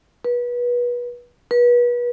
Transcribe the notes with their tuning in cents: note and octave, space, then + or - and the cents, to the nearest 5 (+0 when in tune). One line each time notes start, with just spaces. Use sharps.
B4 -30
B4 -35